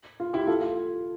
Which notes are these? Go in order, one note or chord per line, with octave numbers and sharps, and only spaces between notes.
F4
E4 G4
F4 A4
F4